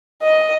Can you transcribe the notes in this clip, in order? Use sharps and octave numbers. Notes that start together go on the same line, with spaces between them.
D#5